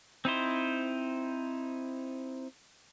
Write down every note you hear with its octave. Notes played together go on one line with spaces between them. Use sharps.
C4 D#4 E4 C5